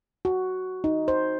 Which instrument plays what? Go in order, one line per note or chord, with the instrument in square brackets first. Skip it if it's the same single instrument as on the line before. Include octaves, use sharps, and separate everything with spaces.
[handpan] F#4
D#4
C5